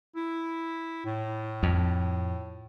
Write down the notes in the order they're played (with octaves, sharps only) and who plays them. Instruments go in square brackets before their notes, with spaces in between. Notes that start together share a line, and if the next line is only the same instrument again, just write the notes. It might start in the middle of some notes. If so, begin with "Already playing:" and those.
[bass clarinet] E4
A2
[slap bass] F2